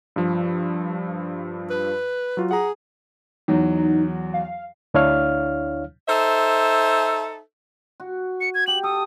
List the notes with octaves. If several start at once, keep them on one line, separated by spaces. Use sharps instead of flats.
G2 F3
B4
F#3 F4 F#4
G#4 F#5 A#5
E2 F#3 D#4
F5
D2 D4 E4 C#5 F5 F6
D#4 A4 C5 E5
F#4
C#7
G#6
G4 F#7
A4 D#6